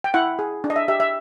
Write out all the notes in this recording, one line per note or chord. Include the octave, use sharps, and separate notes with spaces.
G5
E4 F#5
G#4
D4
D#5
E5
G4 E5
E5